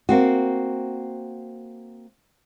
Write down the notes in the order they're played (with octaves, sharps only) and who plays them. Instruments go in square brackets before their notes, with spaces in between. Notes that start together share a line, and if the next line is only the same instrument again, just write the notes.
[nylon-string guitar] A#3 C4 F#4